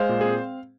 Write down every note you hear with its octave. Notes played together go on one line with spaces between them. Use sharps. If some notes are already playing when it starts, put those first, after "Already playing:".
Already playing: G#3 C5 F5
A#2
C4 G#4